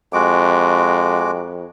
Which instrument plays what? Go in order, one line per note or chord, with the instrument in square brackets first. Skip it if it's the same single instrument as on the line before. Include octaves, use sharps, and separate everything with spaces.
[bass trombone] F2 [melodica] G#3 F#4 D6